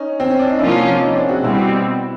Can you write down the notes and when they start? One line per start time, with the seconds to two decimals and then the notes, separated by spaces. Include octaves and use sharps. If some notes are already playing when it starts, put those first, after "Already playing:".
Already playing: C#4 D#4
0.20 C4
0.30 C#4
0.39 D4
0.50 D#4
0.59 C3 F3 A#3 C#4 D4 E4 F4
1.01 C#4 D#4
1.16 C4 D4
1.29 F#4 G#4
1.44 B2 G3 C4 E4 F#4